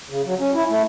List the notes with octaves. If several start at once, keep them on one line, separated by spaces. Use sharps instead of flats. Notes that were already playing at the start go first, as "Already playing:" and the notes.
C#3
F#3
C#4
E4
A3